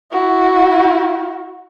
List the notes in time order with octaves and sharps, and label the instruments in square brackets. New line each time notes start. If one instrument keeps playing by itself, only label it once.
[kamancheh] E4 F#4